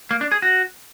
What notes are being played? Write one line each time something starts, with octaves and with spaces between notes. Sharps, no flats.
A#3
D4
G#4
F#4